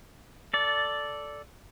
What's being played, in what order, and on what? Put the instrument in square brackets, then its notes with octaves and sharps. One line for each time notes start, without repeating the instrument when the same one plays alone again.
[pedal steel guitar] A4 D5